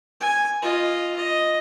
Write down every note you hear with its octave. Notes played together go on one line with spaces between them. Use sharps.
G#5
F4 D#5
D#5